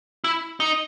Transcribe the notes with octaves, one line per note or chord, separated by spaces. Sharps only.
E4
D#4